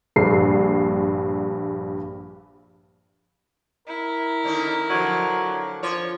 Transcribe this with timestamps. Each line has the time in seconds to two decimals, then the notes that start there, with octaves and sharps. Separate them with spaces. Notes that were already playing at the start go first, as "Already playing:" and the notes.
0.16 A#1 G2 C7
3.88 E4 A#4
4.44 D3 D#3 C#4
4.90 D3 F3 F#3
5.83 F3 C#5